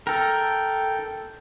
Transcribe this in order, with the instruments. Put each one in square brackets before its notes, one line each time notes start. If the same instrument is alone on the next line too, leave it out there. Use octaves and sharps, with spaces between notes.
[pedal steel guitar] A4 A#4 [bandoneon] G5